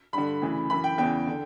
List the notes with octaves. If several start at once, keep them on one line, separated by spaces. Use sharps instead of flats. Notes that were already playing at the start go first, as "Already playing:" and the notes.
G2 D3 B5
D2 C#3 E3
F#2 E3 B5
G5
E2 C#3 E3 G5
D3